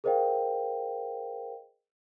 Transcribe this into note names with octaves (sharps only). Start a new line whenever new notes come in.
G#4 A#4 C5 D#5 F5 G5